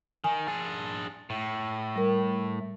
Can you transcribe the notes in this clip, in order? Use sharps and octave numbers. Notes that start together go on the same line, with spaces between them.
D#3 G#5
D4 G#4
A2
G3 A#4